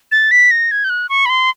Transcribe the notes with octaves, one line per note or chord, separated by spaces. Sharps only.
A6
B6
A#6
G#6
G6
F#6
C#6
B5
C6